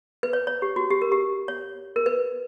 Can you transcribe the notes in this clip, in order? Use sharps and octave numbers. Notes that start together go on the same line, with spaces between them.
B4
C#5
C#5
G4
F#4
G4
A#4
G4
C#5
A#4
B4